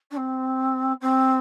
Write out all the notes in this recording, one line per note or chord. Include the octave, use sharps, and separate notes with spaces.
D4
C4
C4